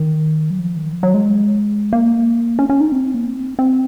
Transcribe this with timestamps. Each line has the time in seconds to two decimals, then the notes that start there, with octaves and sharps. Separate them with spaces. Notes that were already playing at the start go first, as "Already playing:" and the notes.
Already playing: D#3
0.50 F#3
0.59 F3
0.76 D#3
0.93 F3
1.03 F#3
1.14 G#3
1.93 A#3
2.59 C#4
2.69 C#4
2.80 D#4
2.92 C4
3.14 A#3
3.25 C4
3.59 C4